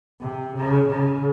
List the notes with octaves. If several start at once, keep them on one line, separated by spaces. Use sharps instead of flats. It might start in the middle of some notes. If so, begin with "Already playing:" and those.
C3
C#3
C#3